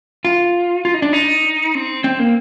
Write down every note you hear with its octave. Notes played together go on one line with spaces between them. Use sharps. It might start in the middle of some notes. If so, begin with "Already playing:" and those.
F4
F4
D#4
D4
D#4
C4
C4
A#3